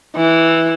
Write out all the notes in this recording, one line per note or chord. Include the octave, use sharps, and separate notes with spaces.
E3